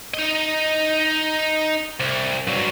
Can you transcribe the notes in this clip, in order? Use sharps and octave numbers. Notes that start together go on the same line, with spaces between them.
D#4 D#5
C2
G2 F#3